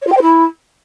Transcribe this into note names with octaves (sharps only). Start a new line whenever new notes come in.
C#5
F4
G5
C5
E4